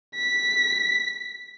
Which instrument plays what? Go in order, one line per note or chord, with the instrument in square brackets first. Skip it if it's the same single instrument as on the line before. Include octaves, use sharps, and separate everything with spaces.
[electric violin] B6